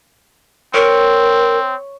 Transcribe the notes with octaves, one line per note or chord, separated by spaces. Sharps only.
C4 A#4 C#5